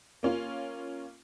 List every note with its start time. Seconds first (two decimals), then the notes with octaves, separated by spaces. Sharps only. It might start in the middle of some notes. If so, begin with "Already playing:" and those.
0.23 A#3 C#4 F4